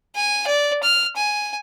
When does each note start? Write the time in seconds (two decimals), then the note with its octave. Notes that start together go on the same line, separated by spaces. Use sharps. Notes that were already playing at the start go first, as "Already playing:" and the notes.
0.16 G#5
0.47 D5
0.83 F6
1.16 G#5